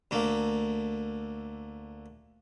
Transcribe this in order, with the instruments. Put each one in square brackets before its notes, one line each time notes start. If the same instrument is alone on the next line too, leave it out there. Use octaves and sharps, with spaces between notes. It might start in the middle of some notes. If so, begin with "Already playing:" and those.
[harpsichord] D2 A3 A#3